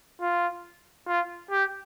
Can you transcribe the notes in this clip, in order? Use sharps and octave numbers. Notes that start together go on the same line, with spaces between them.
F4
F4
G4